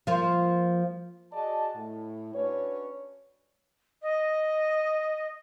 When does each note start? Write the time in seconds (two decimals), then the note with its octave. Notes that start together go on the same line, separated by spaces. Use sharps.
0.07 F3 A#3 F4
1.33 F#4 G#4 D5 D#5 A5
1.76 A2
2.34 C#4 D4 F#4 B4 C#5
4.02 D#5